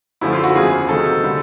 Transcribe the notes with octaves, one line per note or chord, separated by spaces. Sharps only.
F#2 D3 F3 A3 E4
F4
F#4
E2 C#3 F3 A#3 G#4
C3 D#3 F#3 A3 A4
D3 G3